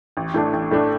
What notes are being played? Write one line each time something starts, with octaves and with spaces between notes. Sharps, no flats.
A1
A2 A3 D4
A1
A2 A3 D4